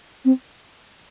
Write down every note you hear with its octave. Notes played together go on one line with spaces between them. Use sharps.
C4